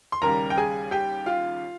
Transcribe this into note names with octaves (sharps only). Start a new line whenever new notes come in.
C6
D#2 C#3 G3 A#4 A#5
G5
G#4 G#5
G4 G5
F4 F5